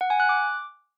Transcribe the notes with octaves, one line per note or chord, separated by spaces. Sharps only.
F#5
G#5
F#6
D6